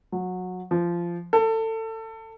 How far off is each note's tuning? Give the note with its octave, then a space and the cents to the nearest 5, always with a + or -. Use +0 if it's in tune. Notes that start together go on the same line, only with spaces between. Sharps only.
F#3 -20
F3 -15
A4 +25